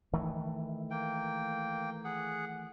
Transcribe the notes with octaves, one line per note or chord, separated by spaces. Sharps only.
D#3 E3 A3
A#3 G5
G#4 F#5